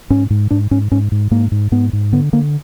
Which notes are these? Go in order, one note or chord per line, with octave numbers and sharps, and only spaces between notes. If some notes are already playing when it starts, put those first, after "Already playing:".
G#2 C#4
G#2
G#2 D4
G#2 C#4
G#2 C#4
G#2
G#2 A#3
G#2
G#2 B3
G#2
D3 B3
D3 A#3